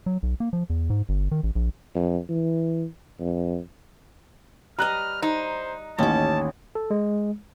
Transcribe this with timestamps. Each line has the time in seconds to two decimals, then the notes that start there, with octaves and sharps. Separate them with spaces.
0.06 F#3
0.23 B1
0.40 A#3
0.53 F3
0.70 E2
0.90 G#2
1.09 G1
1.32 D#3
1.43 A1
1.55 A#1
1.95 F2
2.29 E3
3.19 F2
4.79 G3 B4 D#5 A#5 F6 F#6
5.22 D#4 C5
5.98 A1 D#2 D#3 C#4 A5 D6
6.75 A4
6.90 G#3